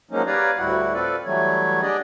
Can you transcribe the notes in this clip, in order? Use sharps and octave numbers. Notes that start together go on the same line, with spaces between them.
F3 F#3 G#3 A#3 C#4 D#4
G4 B4 C#5 D5 F5 A#5
D2 A2 G3 E4 F#4 F#5
C4 F4 A4 B4 D5
E3 F#3 G3 A3 C#5
D4 G4 G#4 D5 D#5